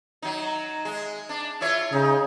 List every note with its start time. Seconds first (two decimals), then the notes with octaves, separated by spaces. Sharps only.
0.22 F#3 D#4
0.85 G#3
1.29 D4
1.61 E4 F4 C#5
1.92 C#3 D#4